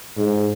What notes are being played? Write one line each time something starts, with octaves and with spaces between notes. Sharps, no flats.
G#2